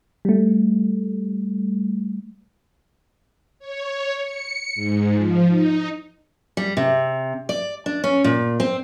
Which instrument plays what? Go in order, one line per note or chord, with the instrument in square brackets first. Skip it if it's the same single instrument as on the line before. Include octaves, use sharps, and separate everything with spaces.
[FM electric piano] G3 A3
[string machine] C#5
C#7
G#2
F3
D#4
[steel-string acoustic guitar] G3
C3
D5
D4
C#4
A#2
C4